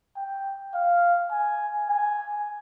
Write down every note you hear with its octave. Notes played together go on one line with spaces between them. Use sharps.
G5
F5
G#5
G#5